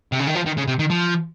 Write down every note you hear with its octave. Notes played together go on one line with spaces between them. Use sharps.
C3
C#3
D#3
F3
D#3
C#3
C3
D#3
F3